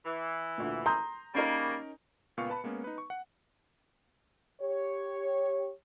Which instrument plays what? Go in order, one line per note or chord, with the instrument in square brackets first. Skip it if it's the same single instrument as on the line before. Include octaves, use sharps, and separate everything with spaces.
[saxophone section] E3
[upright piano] D2 A#2
[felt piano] A#5 [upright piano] C6 D#6 G6
[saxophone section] C#3 G3 A#3 [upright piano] C#4 D#4 A#4
[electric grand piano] C#2 A#2 B3 F5 C#6 C#7
B4 A5 B5
G#3 A#3 B3 C#4
D#4 B4
C#6
F#5
[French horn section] G4 C#5